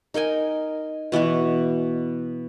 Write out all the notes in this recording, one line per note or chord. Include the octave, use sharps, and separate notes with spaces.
D#4 A#4 G5 G#5
B2 E3 B3 F#4